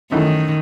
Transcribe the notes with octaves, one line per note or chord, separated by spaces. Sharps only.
F#2 D#3 E3 A3 D#4